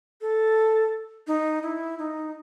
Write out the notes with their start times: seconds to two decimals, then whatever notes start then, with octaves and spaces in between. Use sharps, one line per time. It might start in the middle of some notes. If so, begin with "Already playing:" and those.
0.21 A4
1.27 D#4
1.63 E4
1.99 D#4